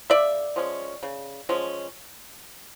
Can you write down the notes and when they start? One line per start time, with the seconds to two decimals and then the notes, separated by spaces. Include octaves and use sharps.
0.10 C#3 D5 E5
0.56 F3 G#3 C#4
1.03 C#3
1.49 F3 G#3 C#4